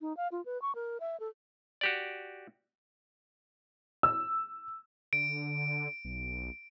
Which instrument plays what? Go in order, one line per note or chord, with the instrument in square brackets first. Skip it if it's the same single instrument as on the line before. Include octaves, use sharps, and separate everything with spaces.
[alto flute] D#4
F5
F4
B4
C#6
A#4
E5
A4
[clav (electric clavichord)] F#4 G4 D5
[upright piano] E6
[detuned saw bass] D3 [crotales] D7
[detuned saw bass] B1